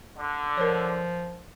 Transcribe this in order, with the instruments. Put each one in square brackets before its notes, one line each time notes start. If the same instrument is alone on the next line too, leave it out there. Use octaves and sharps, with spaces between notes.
[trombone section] D3
[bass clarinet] F3 [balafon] A#4 C#5